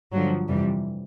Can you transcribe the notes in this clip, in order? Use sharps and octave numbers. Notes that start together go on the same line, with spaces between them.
G2 D3 F3 F#3
F2 C3 E3 G3